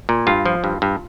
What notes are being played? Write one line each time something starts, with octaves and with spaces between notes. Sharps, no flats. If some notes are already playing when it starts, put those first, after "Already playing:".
A#2
G2 F4
F3
G2
G2